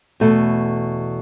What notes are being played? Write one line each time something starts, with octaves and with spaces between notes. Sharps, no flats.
E2 B2 A3